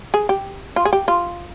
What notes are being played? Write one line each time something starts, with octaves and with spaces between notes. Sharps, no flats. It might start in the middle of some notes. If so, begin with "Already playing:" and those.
G#4
G4
F4
G#4
G4
F4